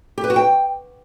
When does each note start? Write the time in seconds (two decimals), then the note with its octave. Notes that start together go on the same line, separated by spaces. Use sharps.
0.18 G4
0.24 B4
0.30 F#4
0.36 G5